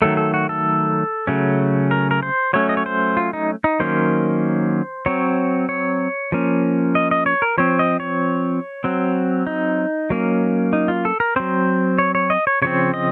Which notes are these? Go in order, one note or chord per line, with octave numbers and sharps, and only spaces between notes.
D#3 F#3 A3 A4
A4
F#4
A4
C#3 F#3 A3 C#4
A#4
A#4
C5
F#3 A3 C#4 C#5
D#5
C#5
C5
F4
D#4
D#4
D#3 F#3 A#3 C#4 C5
F#3 C4 C#5
C#5
F3 A#3 C#4
D#5
D#5
C#5
A#4
F3 C4 C#5
D#5
C#5
F#3 C4
D#4
F#3 A#3 C#4
D#4
F4
A4
A#4
F#3 C4 C5
C#5
C#5
D#5
C#5
C#3 F3 C4 C#5
D#5